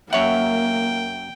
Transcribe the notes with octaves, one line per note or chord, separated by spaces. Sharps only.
F#2 A#3 C#5 E5 F#5 G5